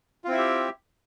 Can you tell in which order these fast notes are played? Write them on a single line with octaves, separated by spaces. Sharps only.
F4 C4 E4 E5 G4